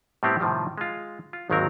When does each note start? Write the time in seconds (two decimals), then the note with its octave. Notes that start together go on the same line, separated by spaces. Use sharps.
0.23 A2 G3 B3 C4 E4 G4
0.40 A2 C3 D#3 F3 G3
0.78 G#3 F4
1.33 F4
1.50 G#1 D#2 D#3 F#3 C4 A#4